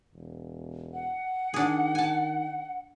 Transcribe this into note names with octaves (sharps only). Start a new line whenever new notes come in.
E1
F#5
D#3 D4 G#4
G#5 A5